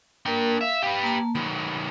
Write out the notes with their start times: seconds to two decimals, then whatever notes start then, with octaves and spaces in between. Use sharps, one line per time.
0.26 A#3 D4 A#4 G5
0.61 E5 F5
0.82 G4 B4
1.03 A#3 A5
1.35 D#3 F#3 B5